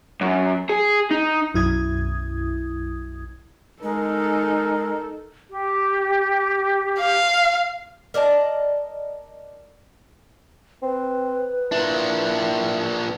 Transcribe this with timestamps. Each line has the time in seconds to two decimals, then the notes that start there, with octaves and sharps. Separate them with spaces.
0.21 F#2
0.69 G#4
1.11 D#4
1.54 B1 F#2 E4 D#6 G#6
3.83 G#3 D#4 A4 A#4
5.50 G4
6.99 F5
8.14 A#4 D5 D#5 A5
10.82 C4 B4
11.72 A#2 D4 E4